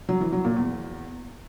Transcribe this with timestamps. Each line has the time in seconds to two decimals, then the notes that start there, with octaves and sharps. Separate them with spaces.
0.09 F#3
0.21 E3
0.33 F#3
0.45 A#2
0.56 E2